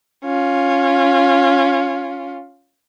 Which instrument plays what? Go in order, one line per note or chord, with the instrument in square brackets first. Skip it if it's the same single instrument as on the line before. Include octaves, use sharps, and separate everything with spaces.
[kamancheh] C#4 F4